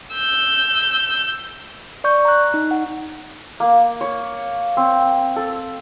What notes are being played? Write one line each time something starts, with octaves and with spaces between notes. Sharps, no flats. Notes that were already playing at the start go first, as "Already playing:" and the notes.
E6 G6
D5 C#6 G6
A#5 F#6
D#4
F#5
A#3
C#5
C4
A4